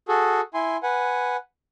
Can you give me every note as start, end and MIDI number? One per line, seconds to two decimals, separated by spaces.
0.08 0.41 66
0.08 0.41 68
0.08 0.41 69
0.54 0.77 64
0.54 0.77 80
0.54 0.77 84
0.83 1.37 71
0.83 1.37 78
0.83 1.37 80